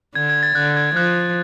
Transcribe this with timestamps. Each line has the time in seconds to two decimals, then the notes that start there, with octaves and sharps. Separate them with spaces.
0.15 D3 G#6
0.30 G#6
0.43 A6
0.55 D3 F#6
0.77 G#6
0.95 F3 F#6